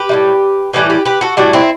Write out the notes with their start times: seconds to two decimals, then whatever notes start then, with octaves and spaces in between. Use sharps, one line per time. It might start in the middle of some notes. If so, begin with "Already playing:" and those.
Already playing: G4 B4
0.09 A2 E3 G3
0.73 A2 E3 G3 G4 B4
0.90 G4 B4
1.05 G4 B4
1.21 F#4 A4
1.37 A2 E3 G3 D4 F#4
1.53 C4 E4